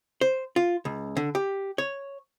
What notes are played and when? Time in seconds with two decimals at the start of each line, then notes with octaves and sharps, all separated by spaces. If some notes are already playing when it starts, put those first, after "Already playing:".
0.21 C5
0.56 F4
0.85 C#2
1.17 D3
1.35 G4
1.78 C#5